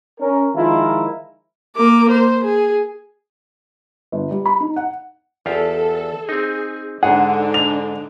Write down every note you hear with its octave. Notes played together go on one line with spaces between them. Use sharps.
C#4 A#4
D#3 F3 G#3 E4 F4 A#4
A#3 D6
C5
G#4
G1
G3
B5
D#4
F#5
E2 F4 G4 A4
C4 D#4 G#4
G#2 D3 D4 D#4 G#4 F#5
F7